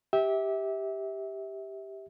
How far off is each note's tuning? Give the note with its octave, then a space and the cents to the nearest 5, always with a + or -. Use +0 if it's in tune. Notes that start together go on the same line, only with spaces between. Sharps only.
G4 +0 E5 -25